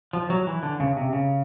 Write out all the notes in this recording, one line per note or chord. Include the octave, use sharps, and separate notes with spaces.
F3
F#3
E3
D3
C#3
C3
C#3